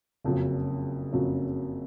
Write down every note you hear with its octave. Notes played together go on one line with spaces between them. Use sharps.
F#1 F2 C#3 F#3
F#1 F2 C#3 F#3